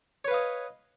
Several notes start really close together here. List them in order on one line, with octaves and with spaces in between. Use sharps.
C#5 B4 F5 D#5